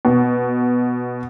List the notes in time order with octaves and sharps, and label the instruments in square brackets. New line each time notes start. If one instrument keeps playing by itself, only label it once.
[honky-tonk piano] B2